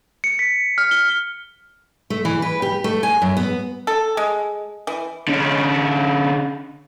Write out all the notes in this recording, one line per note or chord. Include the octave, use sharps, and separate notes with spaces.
C#7
B6
F6
G7
A3
E3
B4
G4
A3
G#5
F#2
B3
A4
G#3
E3
D3 C#4